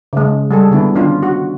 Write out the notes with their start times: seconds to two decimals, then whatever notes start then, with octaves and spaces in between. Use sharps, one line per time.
0.13 C#3 G#3
0.51 G3 G#4 A4
0.71 D3 B3 E4
0.95 D#3 C#4 D4 F4
1.23 F#4